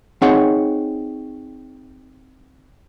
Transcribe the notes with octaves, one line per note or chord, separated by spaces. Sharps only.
C4 D#4 G#4 C#5 F#5